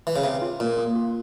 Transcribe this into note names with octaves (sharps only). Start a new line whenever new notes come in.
E3
C#3
C3 F5
F4
A#2 F4
A#3
F4